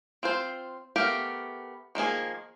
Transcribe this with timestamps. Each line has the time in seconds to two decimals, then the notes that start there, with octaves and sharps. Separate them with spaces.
0.23 C4 F4 C5
0.96 A3 B3 G4 A#4 F5
1.95 D#3 F3 A#3 G#4